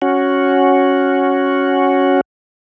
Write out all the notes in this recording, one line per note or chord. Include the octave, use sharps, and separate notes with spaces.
C#4 F#4